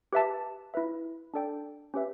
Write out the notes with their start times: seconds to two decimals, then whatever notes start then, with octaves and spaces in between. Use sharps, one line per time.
0.13 G4 B4 E5 A5
0.74 E4 B4 E5
1.34 D4 A4 D5 G5
1.94 C#4 G4 B4 E5